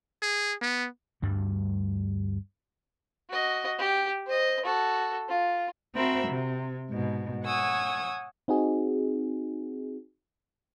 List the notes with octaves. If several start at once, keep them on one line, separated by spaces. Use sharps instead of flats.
G#4
B3
D2 G2 G3
F#4 D#5
G4
C5 D#5
F#4 A4
F4
C4 F#4 A#4 C5 E5 B5
C3
G#2 B2
C#5 F#5 G#5 C#6 D#6 E6
C4 D#4 F#4 G#4